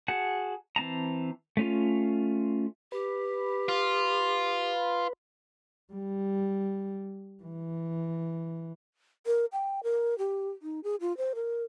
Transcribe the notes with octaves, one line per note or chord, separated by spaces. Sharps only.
F#4 G#4 F#5 A5
E3 C4 A5 A#5
A3 C#4 F4
G4 B4
F4
G3
E3
A#4
G5
A#4
G4
D#4
G#4
F4
C5
A#4